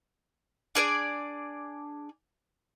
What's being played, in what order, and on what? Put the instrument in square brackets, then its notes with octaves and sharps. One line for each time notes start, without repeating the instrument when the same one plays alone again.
[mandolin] D4 G#4 D5